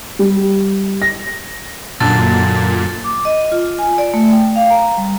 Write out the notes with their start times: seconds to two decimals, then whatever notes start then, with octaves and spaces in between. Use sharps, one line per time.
0.19 G3
1.02 A#6
2.00 F#2 A#2 D3 A6
3.04 D6
3.25 D#5
3.52 F4
3.79 G#5
3.98 D5
4.14 A3
4.32 G5
4.56 F5
4.70 A#5
4.97 G3